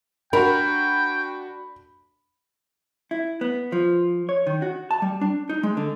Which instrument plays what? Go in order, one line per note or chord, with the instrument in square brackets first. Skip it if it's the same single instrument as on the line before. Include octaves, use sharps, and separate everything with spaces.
[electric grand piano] D4 F#4 [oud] A#4 [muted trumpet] G5 [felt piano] B5
[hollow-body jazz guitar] E4
B3
F3
C#5
D#3
F#4
A5
G3
D4
D#4
G#3
D3